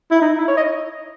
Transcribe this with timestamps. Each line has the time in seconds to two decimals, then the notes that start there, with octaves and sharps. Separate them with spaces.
0.11 E4
0.21 D#4
0.38 E4
0.48 C#5
0.57 D#5